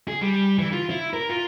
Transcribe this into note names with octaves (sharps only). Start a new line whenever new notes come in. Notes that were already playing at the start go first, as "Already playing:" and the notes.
G#4
G3
E3
F4
E4
A#4
F4